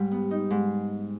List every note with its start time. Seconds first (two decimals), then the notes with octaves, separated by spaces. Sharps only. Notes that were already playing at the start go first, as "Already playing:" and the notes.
Already playing: G#2 G3
0.11 B3
0.31 D#4
0.50 G#2